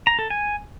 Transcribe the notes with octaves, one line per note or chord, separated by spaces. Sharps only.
A#5
A4
G#5